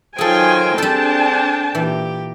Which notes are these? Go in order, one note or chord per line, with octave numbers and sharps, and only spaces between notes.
D#3 F#3 F4 G#4 A4 C5 G5 G#5
G3 C4 D4 G#4 A4 G5 A5
A#2 E3 G4